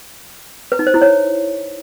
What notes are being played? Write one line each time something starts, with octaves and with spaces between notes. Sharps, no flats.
B4
D#4
C5
E4
C#5